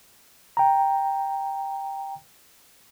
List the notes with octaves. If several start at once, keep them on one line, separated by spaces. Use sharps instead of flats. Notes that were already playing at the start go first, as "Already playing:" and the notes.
G5 A#5